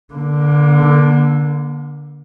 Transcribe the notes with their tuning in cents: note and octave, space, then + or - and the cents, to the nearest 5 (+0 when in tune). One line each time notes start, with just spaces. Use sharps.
D3 +0 A#3 +35